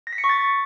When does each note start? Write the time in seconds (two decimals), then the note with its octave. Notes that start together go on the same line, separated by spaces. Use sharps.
0.07 A#6
0.13 B6
0.18 C#7
0.24 C#6
0.29 A6